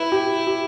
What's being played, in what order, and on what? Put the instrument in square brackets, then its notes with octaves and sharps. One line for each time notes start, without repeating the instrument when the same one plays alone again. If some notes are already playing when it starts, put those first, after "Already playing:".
Already playing: [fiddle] E4 [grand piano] B4
[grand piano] G4
G4